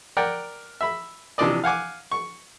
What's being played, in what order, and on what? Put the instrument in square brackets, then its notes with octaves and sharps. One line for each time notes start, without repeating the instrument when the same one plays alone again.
[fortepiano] A#4 D5 F#5 G5
E5 B5
C3 E3 F3 D4 D5 D#5
F5 F#5 G#5 D6
C#6